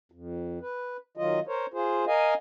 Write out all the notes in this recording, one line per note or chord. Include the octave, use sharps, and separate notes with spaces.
F2
B4
D#3 F#3 F4 D#5
A#4 C5 C#5
F4 G#4 C5
A#4 D#5 F5 G#5